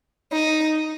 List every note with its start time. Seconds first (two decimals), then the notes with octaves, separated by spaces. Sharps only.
0.33 D#4